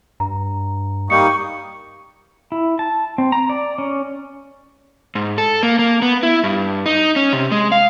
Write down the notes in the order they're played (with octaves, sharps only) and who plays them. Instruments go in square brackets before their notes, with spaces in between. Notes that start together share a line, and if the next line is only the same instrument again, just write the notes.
[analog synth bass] G2 [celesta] A#5
[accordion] G3 A#3 D#4 [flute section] C#6 [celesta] C#7
[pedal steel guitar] E4
A5
C4
A#5
D5
C#4
[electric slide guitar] G#2
A4
A#3
A#3
B3
E4
G2
D#4
C#4
C3
G#3
F5